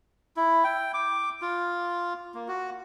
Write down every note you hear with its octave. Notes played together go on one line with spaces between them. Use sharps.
E4
G5
D6
F4
A#3
F#4